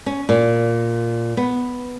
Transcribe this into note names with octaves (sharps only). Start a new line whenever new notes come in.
C#4
A#2
B3